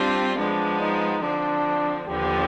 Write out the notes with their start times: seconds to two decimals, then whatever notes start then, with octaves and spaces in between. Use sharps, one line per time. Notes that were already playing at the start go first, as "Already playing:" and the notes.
Already playing: G3 C4 D4 F4
0.38 F3 G#3 B3 D4
0.81 D#4
1.22 D3 F3 C4 D4
2.08 D#2 D3 F3 B3 G4